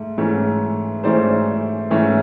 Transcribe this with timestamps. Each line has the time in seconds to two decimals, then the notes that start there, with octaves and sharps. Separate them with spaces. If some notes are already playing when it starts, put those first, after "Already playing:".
Already playing: G#2 A3
0.18 G#2 E3 A3 C#4
1.04 G#2 E3 A3 C#4 C5 D5
1.91 G#2 E3 A3 C#4